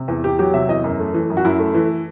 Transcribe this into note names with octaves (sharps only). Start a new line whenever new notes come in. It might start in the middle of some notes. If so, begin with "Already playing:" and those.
Already playing: C3
E2
E2 G4
F#3 G4
C3 E5
E2 D#5
F#2
A3
E3
F#2
F#4
F#2 E4
A3
E3